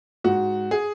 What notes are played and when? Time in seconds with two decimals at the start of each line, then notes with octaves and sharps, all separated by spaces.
0.24 G#2 F#4
0.71 G#4